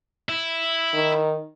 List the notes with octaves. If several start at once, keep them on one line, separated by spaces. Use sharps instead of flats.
E4
D#3